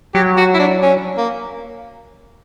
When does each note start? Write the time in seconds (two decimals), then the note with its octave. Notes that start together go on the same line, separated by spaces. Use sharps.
0.15 F#3 G4
0.37 F#4
0.54 E4
0.60 D4
0.83 C#4
1.18 A#3